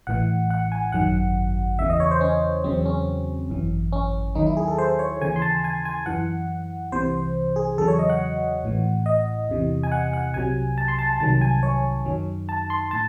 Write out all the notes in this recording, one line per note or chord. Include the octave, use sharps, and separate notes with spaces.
A1 A2 E3 F#5
F#5
G#5
G#1 F#2 D#3 F#3 F#5
E2 C#3 E3 E5
D#5
C#5
C5
C#4
E2 C#3 F#3 C4
C#4
G#1 F#2 E3
C#4
D#2 D#3 F#3 D#4
E4
G#4
A4
C5
C#5
D#2 C#3 E3 G#5
C6
A5
G#5
G#5
F#2 E3 F#5
C2 C3 E3 C5
G#4
E2 C#3 F#3 A4
C#5
D#5
F#5
A1 A2 E3
D#5
E2 C3 E3
G#5
F#5
F#5
C2 C3 F#3 G#5
A5
C6
A5
A5
C2 C3 D#3 F#3 A5
G#5
C#5
F#2 D#3 F#3
A5
C6
A2 A5